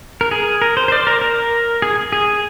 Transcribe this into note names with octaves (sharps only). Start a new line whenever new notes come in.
A#4
G#4
A#4
C5
C5
D5
A#4
A#4
G#4
G#4